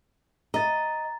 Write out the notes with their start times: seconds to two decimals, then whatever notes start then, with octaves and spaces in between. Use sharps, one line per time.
0.54 D#5 A#5 A6